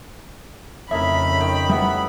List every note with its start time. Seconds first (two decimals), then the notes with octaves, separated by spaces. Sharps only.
0.91 F2 A2 C#3 D#4 A#4 E5 B5
1.40 D#3 G5
1.69 A2 G3 B3 E5 F#5